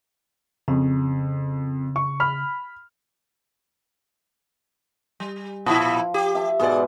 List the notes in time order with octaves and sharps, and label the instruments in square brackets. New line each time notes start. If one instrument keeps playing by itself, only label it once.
[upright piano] F2 [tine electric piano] C#3
[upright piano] C#6
B5 F6
[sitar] G3
[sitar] A#2 E4 [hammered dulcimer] F3
[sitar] G4
[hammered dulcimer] E5 A5
[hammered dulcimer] G#2 B2 G#3 [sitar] G#4 D5